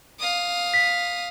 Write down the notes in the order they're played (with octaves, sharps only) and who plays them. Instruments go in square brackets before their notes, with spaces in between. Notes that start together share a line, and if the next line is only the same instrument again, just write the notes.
[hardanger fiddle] F5 D#6
[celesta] B6